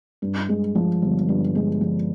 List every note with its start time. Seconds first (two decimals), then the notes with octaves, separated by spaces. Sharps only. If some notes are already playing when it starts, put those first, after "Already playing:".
0.22 G2
0.49 G#3
0.75 F3
1.02 G1
1.29 G2
1.55 G#3
1.81 F3